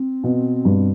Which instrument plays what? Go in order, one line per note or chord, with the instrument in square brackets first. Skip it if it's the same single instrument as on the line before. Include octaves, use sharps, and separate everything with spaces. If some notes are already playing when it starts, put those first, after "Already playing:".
Already playing: [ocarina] C4
[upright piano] B2
G2